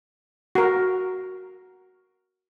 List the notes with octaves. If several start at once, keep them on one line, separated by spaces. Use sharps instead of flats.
F#4 A#4